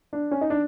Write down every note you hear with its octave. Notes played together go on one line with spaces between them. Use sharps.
D4
C#4
D#4
D4